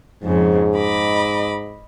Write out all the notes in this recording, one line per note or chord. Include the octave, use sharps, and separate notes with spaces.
F2 G#2 C#3
D#5 B5 D6